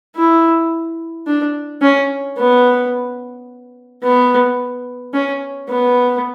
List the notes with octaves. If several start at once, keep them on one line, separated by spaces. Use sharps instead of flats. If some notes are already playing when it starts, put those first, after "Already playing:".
E4
D4
C#4
B3
B3
C#4
B3